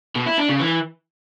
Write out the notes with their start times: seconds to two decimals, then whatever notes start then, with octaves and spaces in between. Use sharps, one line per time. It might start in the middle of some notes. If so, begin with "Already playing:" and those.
0.16 B2
0.27 E4
0.38 D4
0.49 C#3
0.61 E3